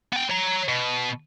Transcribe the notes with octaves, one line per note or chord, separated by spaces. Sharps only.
B3 G5
C#5 A#5
B2